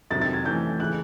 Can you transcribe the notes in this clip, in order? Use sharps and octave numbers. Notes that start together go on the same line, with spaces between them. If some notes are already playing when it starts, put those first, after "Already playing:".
F2 C3 D#3 F#3 A6
A6
G#6
E3 A3 C#4 G6
C#3 E3 F#6